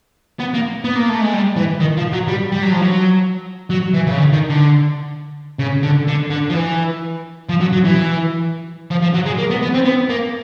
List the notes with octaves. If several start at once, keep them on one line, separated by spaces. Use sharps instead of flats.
B3
A#3
B3
A#3
A3
G#3
G3
E3
D#3
F3
F#3
G3
G3
F#3
F3
F#3
F#3
E3
C#3
D3
D#3
D3
C#3
D3
D3
D3
F3
E3
F3
F#3
F#3
E3
F3
F3
F#3
G#3
A#3
B3
B3
C4
B3
A#3